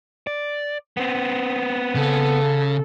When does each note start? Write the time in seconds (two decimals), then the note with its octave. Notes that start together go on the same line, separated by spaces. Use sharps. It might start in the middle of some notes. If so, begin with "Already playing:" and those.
0.27 D5
0.97 B3 C4
1.95 C#3 C#4 A4